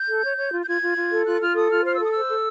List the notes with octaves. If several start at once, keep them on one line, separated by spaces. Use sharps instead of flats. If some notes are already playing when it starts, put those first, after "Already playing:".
Already playing: G6
A4
C#5
C#5
F4
G6
F4 G#6
F4
F4
A4
F4 F#6
F4 F6
A4 D#6
F4 F6
C5 F6
E6
A4 D#6
C5 E6
A4